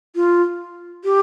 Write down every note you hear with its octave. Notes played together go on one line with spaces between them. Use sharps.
F4
G4